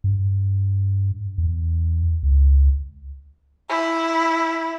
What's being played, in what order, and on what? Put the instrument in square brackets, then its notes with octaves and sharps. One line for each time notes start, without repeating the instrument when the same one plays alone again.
[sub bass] G2
E2
C#2
[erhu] E4